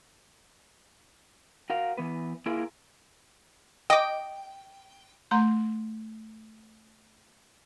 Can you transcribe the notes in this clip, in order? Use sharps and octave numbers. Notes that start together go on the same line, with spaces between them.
F#4 A#4 F5
E3 B3 B4
A#3 E4 F4 G#4 A#4
D#5 G5 D6
A3 A#5 C6